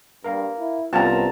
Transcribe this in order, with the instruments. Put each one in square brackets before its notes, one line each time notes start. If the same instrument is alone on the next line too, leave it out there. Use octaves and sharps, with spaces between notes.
[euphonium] G2 [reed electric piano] A#4 F5 A#5
[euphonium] E4
[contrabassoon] C2 [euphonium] B3 [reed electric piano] C#4 F4 C5 [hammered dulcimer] A5 A#5